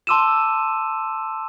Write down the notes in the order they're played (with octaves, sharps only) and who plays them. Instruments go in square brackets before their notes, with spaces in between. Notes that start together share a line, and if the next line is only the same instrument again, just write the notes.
[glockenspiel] A5 C6 D6 E6 D#7 E7